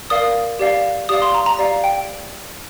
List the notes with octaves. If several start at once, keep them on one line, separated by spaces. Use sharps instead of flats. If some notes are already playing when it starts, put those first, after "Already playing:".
A#4 D5 F5 D#6
G4 D5 F5
G4 D5 F5 D#6
C6
A#5
A#5
G4 D5 F5
G5